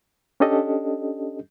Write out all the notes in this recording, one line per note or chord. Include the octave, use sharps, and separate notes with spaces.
C#4 D4 G4 A4 D#5